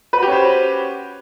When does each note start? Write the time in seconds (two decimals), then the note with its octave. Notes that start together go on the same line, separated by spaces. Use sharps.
0.13 B4
0.18 F#4
0.23 G4
0.27 C#4
0.32 C5